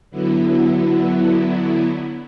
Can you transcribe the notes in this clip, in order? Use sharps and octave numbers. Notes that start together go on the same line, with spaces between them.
D3 F#3 B3 E4